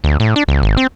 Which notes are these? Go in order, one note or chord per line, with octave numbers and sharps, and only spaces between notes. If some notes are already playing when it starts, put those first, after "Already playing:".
D2
A2
D4
C#2
G#1
C4